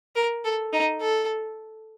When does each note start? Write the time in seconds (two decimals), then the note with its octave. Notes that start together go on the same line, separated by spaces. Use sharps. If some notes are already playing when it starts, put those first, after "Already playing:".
0.16 A#4
0.45 A4
0.74 D#4
1.01 A4